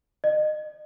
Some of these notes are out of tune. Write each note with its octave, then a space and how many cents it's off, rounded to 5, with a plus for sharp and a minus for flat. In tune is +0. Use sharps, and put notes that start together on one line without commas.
D#5 -30